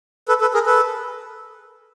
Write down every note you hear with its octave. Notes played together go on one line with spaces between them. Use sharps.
A4 B4
A4 B4
G#4 A#4
A4 B4